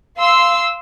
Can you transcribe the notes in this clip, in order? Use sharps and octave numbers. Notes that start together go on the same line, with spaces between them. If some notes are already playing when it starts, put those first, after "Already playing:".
F5 C6 E6